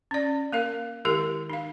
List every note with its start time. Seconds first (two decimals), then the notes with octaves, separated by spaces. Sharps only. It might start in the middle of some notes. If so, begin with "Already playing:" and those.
0.11 C#4 D5
0.52 A#3 A#4 F5
1.05 D#3 G#3 E4 G4 A#4
1.50 D#4 F5